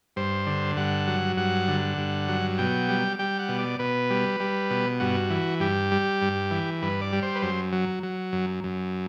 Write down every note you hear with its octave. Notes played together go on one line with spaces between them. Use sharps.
G2 C5
D3
G2 F#5
F#3
G2 F#5
D3
G2
F#3
B2 G5
G3
G3 G5
F#5
B2
D5
B2 B4
G3
G3
B2
G2 F#4
E3
G2 G4
G3
G2
E3
G2 B4
D5
G3
C5
B4
F#2 C5
F#3
F#3
F#2
F#2